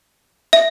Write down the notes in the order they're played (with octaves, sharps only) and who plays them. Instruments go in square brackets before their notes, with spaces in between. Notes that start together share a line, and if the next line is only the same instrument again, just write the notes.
[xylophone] E5